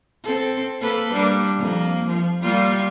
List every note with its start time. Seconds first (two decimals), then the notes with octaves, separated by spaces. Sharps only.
0.24 C4 A4
0.81 A#3 A4 B4
1.12 G3 A#3 D4
1.57 F2 A#3
2.08 F3
2.42 G3 A#3 F4